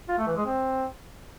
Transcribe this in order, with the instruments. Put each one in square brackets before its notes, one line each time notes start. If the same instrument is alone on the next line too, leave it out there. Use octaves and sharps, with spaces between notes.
[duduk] F4
A3
E3
G#3
C4